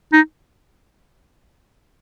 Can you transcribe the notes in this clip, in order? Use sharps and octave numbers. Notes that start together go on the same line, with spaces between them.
D#4